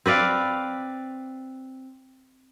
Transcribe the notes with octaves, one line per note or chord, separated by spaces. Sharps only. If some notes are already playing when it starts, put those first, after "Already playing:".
C4 B4 D5 F5